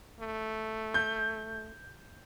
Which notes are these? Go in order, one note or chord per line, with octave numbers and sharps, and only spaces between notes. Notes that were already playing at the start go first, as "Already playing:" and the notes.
A3
G6